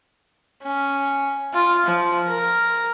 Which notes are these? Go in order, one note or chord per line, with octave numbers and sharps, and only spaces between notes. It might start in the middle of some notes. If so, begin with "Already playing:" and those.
C#4
F4
F3
A#4